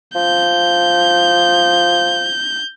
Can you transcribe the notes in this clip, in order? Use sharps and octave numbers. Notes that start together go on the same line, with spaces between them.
F3 G6